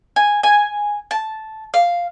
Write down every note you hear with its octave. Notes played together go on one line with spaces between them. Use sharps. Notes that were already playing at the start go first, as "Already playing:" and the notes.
G#5
G#5
A5
F5